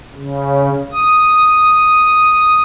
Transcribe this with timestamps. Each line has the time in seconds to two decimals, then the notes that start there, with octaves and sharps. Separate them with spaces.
0.15 C#3
0.92 D#6